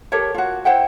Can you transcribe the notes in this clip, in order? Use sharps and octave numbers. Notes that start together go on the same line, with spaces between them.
G4 A4 A#4 C#5
F4 F#4
E4 C5 F#5 G5